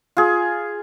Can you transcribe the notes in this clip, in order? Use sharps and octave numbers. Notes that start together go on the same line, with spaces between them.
F4 G#4